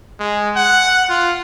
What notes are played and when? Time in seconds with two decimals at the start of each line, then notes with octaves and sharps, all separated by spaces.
0.20 G#3
0.56 F#5
1.10 F4